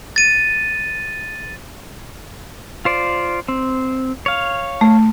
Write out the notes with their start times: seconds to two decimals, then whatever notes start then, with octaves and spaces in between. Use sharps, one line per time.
0.16 A6 D#7
2.85 F4 C5 D5
3.48 C4
4.26 C#5 F5
4.81 A3